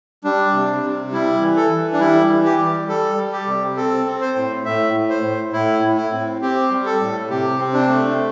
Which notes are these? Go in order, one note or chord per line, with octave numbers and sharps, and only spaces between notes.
G3 D4
C3
C3
G3 E4
E3
A4
E3
D4
G3 E4
E3
G4
G3
G3 A4
G3
G4
C3
C4 A4
C4
C5
A2
A2 E5
A2
C5
A2
A2 E4
A2
E4
C4
C4 G4
G3
A4
A2
C3 G4
C4
D4
A3